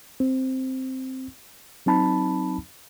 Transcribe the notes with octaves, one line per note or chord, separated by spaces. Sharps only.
C4
F#3 C4 D#4 A5 B5